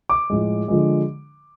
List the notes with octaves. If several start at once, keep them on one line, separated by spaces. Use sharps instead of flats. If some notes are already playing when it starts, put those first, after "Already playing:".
D6
A2 F3 G#3
D3 F3 G#3